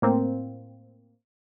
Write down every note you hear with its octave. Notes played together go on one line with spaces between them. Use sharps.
A2 A#3 C4